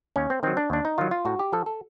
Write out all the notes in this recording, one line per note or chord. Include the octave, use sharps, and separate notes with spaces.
D#2 C#4
C4
D#3 F#3 C4
D4
D#2 D4
D#4
D#3 F#3 F4
F4
A2 F#4
G4
F3 A4
A4